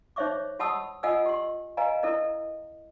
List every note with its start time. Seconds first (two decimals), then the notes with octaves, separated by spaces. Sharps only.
0.16 D#4 C5 C#5 E5 C#6 D6
0.59 G4 F#5 A5 B5 D#6 E6
1.03 F4 A4 D#5 F#5 G#5 E6
1.26 G4 C6
1.77 B4 D#5 F5 G#5 A#5
2.03 E4 A4 A#4 D#5